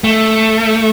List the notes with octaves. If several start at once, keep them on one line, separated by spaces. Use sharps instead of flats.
A3